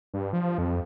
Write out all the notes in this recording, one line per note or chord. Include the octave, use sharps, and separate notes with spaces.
G2
F3
F2